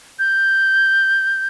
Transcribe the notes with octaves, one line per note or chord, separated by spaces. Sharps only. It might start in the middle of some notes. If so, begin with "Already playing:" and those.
G6